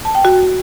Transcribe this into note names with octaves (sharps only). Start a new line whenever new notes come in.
A5
G5
F#4